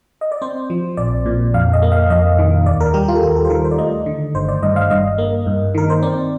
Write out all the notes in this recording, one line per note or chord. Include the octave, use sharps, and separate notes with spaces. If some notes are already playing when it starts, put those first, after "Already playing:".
D#5
D5
C4 C5
F3
A#1 D5
A#2
F2 F5
D#5
A#3
F5
F2 D#5
D#3
D#2 D5
A#4
G3 G4
F4
A4
D#2 G4
A4
C5
D#3 A#4
C5
D5
A3 D#5
D3
G1 C5
D5
G2 D#5
F5
G2 D#5
A#3
G2
D#3 A#4
C5
C4 D5